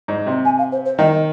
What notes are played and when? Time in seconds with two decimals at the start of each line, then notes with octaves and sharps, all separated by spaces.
0.08 G#2
0.26 C3
0.45 G#5
0.58 F5
0.72 C5
0.85 C5
0.99 D#3 D#5